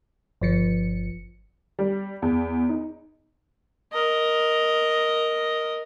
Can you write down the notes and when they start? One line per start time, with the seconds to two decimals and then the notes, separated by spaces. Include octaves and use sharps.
0.42 G1 F3 C#7
1.79 G3
2.22 E2
2.69 D#4
3.93 A#4 D#5